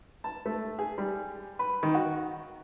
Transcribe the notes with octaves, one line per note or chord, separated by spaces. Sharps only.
A5
A3
G#4
G3
B4
D#3
F#4